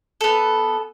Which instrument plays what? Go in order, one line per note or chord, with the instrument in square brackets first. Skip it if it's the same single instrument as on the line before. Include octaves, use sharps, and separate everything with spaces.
[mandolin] B3 A4